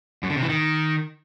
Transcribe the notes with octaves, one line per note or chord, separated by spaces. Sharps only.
F#2
D3
C3
E3
D#3